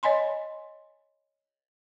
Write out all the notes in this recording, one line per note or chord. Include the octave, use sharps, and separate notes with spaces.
C#5 D#5 G#5 B5 C6